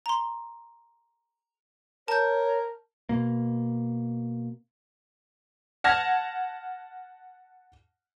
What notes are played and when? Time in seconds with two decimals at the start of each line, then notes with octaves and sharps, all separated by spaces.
0.06 A#5 C6
2.08 A#4 C#5 A5 G6
3.09 B2 A#3
5.84 F#5 A5 F6 G#6 A#6